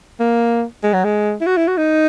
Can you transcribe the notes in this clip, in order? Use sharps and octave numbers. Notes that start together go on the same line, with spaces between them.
A#3
G#3
F#3
G#3
E4
F#4
E4
F#4
D#4